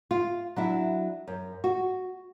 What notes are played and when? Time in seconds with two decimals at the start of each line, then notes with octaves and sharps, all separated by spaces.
0.11 F4
0.56 F#3 D4 E4
1.27 F#2
1.64 F#4